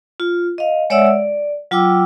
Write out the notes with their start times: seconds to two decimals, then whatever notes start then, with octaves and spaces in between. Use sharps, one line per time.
0.20 F4
0.58 D#5 F5
0.90 G#3 C#5 D5 E5 F#5 E6
1.07 D5
1.71 F#3 F4 G5 D6 E6